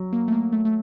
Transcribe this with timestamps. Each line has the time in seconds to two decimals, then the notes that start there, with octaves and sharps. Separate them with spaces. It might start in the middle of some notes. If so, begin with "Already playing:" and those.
Already playing: F#3
0.13 A#3
0.28 A3
0.32 A#3
0.53 A3
0.65 A3